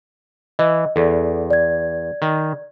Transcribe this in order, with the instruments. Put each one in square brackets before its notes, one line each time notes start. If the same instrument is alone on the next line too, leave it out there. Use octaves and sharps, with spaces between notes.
[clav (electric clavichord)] E3 [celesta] D#5
[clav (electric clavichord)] E2 [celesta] A4 D5
[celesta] D5 G#6
[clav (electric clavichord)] D#3